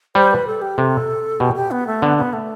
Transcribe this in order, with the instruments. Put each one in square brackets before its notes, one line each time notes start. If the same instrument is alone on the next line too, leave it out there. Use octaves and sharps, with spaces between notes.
[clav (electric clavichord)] G3 [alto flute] C5
[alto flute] B4
A4
G4
[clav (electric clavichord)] C3 [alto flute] A4
[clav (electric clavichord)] B2 [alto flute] G4
[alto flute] G4
B3
A3
[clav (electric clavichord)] D3 [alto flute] B3
[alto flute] B3
A3